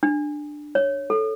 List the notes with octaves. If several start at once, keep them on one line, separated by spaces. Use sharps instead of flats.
D4
C#5
A4